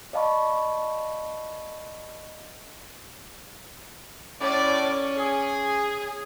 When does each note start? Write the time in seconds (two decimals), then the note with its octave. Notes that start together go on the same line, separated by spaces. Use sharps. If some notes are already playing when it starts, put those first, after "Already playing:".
0.13 D5 D#5 F5 A5 B5 C#6
4.41 A2 C#4 D5
5.18 G#4